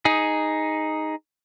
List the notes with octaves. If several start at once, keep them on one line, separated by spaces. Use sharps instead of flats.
D#4 G#4